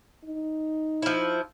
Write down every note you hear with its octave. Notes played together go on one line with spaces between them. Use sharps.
D#4
F3 E4